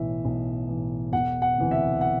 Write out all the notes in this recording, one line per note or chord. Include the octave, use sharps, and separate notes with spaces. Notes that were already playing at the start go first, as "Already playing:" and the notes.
Already playing: B1 A2 E3 E5
B1
A2 E3
E1 F#5
F#5
D2 C3 E3
E5
F#5